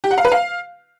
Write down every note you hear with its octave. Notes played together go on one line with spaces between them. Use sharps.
G4
F#5
F5
B4
F5